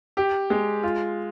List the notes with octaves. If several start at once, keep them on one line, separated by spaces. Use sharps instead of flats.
G4
G#3
F4